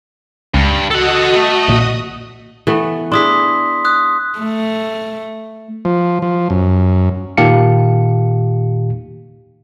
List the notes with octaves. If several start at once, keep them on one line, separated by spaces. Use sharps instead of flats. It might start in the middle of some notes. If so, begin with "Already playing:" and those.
C#2 G2
F#4 A4 D#5 F#5 D#6
A3
B1 A#2
E3 A3 B3
D4 E4 G#4 C6 D#6 B6
D#6 F#6
A3
F3
F3
F#2
A#2 D#3 G4 F5 A5 C#7